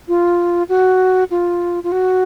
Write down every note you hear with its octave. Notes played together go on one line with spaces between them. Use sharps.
F4
F#4
F4
F4
F#4